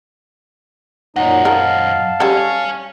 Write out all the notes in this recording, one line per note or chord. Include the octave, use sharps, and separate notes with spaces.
F#2 A#2 F#3 D#4 D#5 F#5
A#4 F5 A5
G3 C#4 A4 C#5 G#5